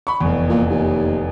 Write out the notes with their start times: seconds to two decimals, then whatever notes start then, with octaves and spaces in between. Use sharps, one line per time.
0.07 B5 C#6
0.21 F1 E2
0.49 A#2
0.70 D#2